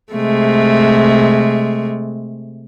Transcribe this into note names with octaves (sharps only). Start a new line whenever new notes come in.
C3 G#3 A3